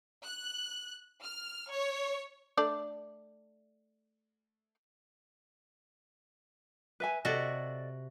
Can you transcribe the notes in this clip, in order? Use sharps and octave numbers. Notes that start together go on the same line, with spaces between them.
F#6
F6
C#5
A3 D4 D5
B4 E5 G#5
C3 F#4 A4 D5 D#5